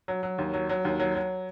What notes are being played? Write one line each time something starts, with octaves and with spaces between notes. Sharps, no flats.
F#3
F#3
D#2
F#3
F#3
D#2
F#3
F#3